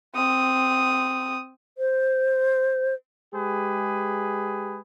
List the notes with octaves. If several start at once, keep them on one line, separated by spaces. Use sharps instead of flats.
C4 D#6
C5
G#3 G4 G#4 B4